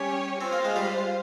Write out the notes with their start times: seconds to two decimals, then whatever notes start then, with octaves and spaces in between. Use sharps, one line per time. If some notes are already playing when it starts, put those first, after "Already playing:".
Already playing: G3 C#4 G4 C#5 G#5
0.41 C4 F4 C5 F5
0.53 A#3
0.65 G#3
0.76 G3